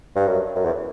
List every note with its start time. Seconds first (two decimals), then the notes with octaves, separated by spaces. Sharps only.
0.16 G2
0.27 F#2
0.56 F#2
0.65 E2